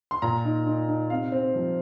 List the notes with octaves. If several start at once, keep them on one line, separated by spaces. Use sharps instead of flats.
C6
A#2 A#5
D#4
D#4
D#4
C3 F5
C4
F3